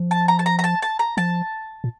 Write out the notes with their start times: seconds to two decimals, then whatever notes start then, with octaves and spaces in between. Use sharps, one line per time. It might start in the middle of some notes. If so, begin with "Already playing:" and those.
Already playing: F3
0.11 A5
0.28 A#5
0.39 A5
0.46 A#5
0.59 A#5
0.64 A5
0.82 A5
0.99 A#5
1.17 F3 A5
1.84 A#2